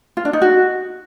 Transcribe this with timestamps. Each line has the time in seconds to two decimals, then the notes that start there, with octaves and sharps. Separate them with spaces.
0.17 F4
0.25 D4
0.33 D#4
0.42 F#4